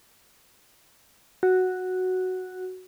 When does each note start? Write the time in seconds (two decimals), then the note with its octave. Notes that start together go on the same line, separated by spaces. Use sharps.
1.43 F#4